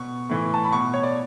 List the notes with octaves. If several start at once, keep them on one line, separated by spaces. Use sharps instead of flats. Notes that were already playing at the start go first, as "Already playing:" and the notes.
Already playing: B2 C#6
A2 E3
A5
B5
B2 C#6
C#5
D5